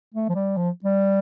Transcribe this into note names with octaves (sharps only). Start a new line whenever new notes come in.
A3
F3
G3
F3
G3